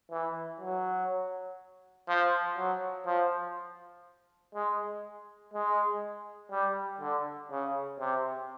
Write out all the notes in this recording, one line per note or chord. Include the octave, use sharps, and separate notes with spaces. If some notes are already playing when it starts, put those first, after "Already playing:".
E3
F#3
F3
F#3
F3
G#3
G#3
G3
D3
C#3
C3